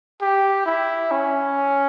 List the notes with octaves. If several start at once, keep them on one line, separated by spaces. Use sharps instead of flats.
G4
E4
C#4